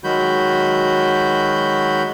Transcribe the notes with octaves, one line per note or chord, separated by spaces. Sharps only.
D#3 F#3 G#3 F#4 B5 G6